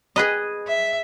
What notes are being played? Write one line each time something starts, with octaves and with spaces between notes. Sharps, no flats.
G#4 B4 D#5
E5